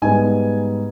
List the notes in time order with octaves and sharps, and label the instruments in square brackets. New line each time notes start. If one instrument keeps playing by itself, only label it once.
[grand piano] G#2 G3 B3 G#5